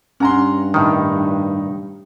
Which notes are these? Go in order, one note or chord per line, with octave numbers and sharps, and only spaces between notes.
G2 C#4 F#5 A#5 C6
A2 D#3 D#4